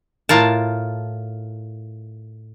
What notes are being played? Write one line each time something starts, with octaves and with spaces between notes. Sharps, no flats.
A2 F4 A#4 A5